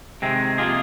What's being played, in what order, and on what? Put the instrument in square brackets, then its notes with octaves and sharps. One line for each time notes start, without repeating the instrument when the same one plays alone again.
[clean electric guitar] C3 D#3 G#3 C4
C3 F3 A#3 F4 G#4